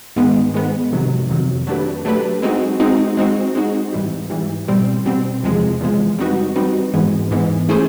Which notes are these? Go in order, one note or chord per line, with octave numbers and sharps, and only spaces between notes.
G#2 D#3 G#3 B3
G#2 D#3 G#3 B3
F2 C3 D#3 F#3
F2 C3 D#3 F#3
F#3 A3 D4 G4 B4
F#3 A3 D4 G4 B4
G#3 C4 D#4 F#4
G#3 C4 D#4 F#4
G#3 C4 D#4 F#4
G#3 C4 D#4 F#4
G#2 E3 G3
G#2 E3 G3
B2 G3 C4
B2 G3 C4
E2 C3 F3 G#3
E2 C3 F3 G#3
G3 C4 D#4 F#4 B4
G3 C4 D#4 F#4 B4
G#2 E3 G#3 B3
G#2 E3 G#3 B3
A3 C#4 E4 G#4 C5